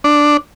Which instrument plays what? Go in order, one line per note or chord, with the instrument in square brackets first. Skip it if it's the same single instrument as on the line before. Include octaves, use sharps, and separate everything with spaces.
[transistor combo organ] D4